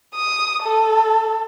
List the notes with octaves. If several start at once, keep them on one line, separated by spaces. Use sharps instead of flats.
D#6
A4